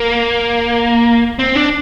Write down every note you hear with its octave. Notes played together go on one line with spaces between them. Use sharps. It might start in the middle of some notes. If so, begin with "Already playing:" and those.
Already playing: A#3
C4
D4